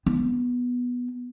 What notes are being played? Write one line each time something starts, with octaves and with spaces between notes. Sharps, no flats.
B3